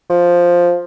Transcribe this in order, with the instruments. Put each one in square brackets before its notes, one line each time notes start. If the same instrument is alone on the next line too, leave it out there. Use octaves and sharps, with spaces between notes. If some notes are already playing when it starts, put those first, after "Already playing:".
[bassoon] F3